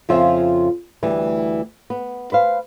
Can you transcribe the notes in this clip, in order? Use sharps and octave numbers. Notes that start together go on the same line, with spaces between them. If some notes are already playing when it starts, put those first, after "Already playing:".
F2 C#3 F3 F4 C5 E5
D2 E3 G3
B3
B4 C5 F5